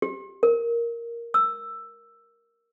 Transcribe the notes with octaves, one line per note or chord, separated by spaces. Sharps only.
G4
A#4
E6